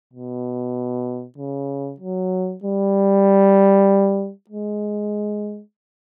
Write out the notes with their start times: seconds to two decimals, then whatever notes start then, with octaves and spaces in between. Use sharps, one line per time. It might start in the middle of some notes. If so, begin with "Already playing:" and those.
0.13 B2
1.38 C#3
2.00 F#3
2.63 G3
4.50 G#3